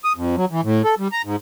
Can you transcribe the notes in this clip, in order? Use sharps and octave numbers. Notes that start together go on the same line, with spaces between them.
D#6
F2
F#3
E3
A2
A4
G3
A#5
G#2